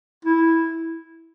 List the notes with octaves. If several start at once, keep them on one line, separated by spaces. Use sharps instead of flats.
E4